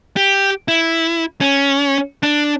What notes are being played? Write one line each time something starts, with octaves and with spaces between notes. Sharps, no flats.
G4
E4
C#4
D4